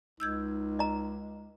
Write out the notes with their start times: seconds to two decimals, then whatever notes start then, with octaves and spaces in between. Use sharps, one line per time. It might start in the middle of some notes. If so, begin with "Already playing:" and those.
0.20 C#2 D#4 E6 G6 G#6
0.79 D#5 A#5